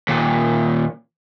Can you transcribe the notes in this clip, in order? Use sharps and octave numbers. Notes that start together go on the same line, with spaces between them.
D#2 A#2